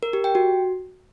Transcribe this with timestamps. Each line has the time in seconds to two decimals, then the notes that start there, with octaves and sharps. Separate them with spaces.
0.03 A#4
0.13 G4
0.24 G5
0.35 F#4